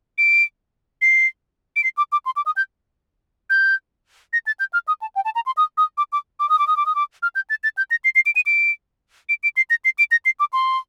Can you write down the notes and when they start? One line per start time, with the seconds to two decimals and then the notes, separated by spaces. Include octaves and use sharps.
0.18 D7
1.02 C7
1.76 D7
1.84 C7
1.97 D6
2.12 D6
2.26 C6
2.36 D6
2.46 D#6
2.56 G6
3.50 G6
4.33 A#6
4.47 A6
4.60 G6
4.73 F6
4.88 D#6
5.02 A5
5.15 G5
5.25 A5
5.35 A#5
5.46 C6
5.57 D#6
5.77 D#6
5.98 D6
6.12 D6
6.40 D6
6.49 D#6
6.59 D6
6.67 D#6
6.77 D6
6.86 D#6
6.95 D6
7.23 F6
7.35 G6
7.50 A6
7.64 A6
7.77 G6
7.91 A#6
8.04 C7
8.15 C7
8.26 D7
8.36 D#7
8.46 D7
9.29 D7
9.43 D7
9.57 C7
9.70 A#6
9.85 C7
9.99 D7
10.11 A#6
10.25 C7
10.40 D6
10.53 C6